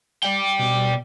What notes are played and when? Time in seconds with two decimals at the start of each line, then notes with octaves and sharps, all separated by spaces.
0.23 D5 G5
0.59 B2